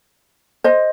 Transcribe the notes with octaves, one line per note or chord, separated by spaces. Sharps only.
C5 D#5